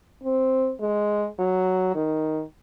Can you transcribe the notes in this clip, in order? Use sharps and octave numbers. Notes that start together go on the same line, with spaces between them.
C4
G#3
F#3
D#3